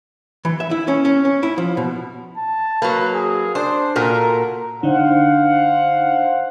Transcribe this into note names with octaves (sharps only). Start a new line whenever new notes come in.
E3
E5
E4
C#4
C#4
C#4
E4
F3
B2
A5
F#3 A#3 B4
G#4
D4 C5
A#2 F#4 A4 A#4
D3 D4 D#4 C5 F5 F#5